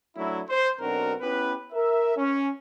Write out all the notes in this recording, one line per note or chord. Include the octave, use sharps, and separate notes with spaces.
F#3 A3 D4 E4
C5
B1 C4 D4 F#4 A#4
B3 C#4 E4 G4 B4
A#4 E5
C#4